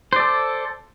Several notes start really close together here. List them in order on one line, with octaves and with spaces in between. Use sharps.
C5 D5 A4